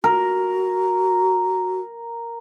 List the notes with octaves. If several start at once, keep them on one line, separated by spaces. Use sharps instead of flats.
F#4 A#4